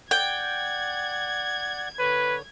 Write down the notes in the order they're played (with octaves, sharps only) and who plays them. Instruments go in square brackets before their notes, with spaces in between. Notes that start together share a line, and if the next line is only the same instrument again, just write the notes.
[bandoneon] D5 F#5 [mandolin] G5 [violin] G#6
[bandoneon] D3 C#5 [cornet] B4